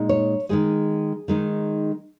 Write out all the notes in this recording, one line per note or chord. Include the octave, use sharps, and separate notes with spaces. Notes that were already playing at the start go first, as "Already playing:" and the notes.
Already playing: A#2 G#3 D#4
C#5
D#3 G#3 D#4 G#4
D#3 G#3 D#4